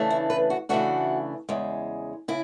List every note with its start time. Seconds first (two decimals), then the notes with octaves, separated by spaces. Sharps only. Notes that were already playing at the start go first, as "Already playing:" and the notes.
Already playing: C#3 E3 A3 D4
0.10 E4
0.30 B4
0.50 F#4
0.69 C#3 E3 A3 D4 F#4
1.49 E2 C#3 G#3
2.28 C#3 E4